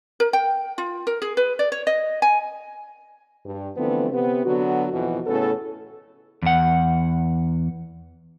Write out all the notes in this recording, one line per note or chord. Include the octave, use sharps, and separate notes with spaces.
A#4
G5
F4
A#4
G#4
B4
D5
C#5
D#5
G#5
G2
D3 E3 F3 A3 B3 C4
C3 B3 C4
D3 F#3 B3 F#4
F2 B2 E3 F#4
A2 C#3 B3 C#4 A4
E2 F#5